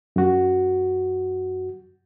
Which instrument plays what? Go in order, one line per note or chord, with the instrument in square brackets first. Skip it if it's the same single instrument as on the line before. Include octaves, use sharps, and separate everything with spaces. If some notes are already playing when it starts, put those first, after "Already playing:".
[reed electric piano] F#2 F#4